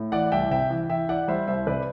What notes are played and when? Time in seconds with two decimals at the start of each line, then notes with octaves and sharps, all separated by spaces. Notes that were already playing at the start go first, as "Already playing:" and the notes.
Already playing: A2
0.12 E3 D5 F#5
0.32 C2 E5 G5
0.51 C3 E5 G5
0.70 E3
0.90 E3 E5 G5
1.09 E3 D5 F#5
1.28 G3 C5 E5
1.47 C2 C5 E5
1.67 C3 B4 D5